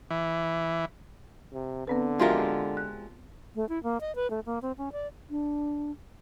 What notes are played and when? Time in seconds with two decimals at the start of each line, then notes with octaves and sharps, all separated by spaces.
0.11 E3
1.53 C3
1.87 D3 B3 C4 B4
2.20 F3 F#3 G#3 F4 G4 A#4 E5 C6
2.77 F#6
3.55 A3
3.69 E4
3.83 A#3
4.01 D#5
4.16 B4
4.31 A3
4.46 A#3
4.62 C4
4.78 C#4
4.92 D5
5.30 D4